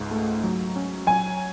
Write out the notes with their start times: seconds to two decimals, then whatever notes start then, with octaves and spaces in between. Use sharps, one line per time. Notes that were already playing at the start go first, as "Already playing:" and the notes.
Already playing: C#2 G#2
0.11 A3
0.43 F#3
0.76 C#4
1.07 F#3 G#5